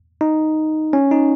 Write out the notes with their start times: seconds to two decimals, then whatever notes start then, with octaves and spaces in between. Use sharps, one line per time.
0.21 D#4
0.93 C#4
1.11 D#4